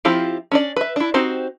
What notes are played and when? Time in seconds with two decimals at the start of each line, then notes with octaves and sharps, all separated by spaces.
0.05 F3 C4 E4 F4 G4
0.52 C#4 D4 D5
0.76 B4 E5
0.96 D4 E4
1.14 C4 D#4 F#4 G4 C5